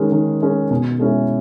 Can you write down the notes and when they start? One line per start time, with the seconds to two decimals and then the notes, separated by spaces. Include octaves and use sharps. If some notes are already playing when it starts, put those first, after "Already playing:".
Already playing: D#3 G#3 C#4
0.12 D#3
0.42 G#3 C#4
0.71 B2
0.99 G#3 C#4 E4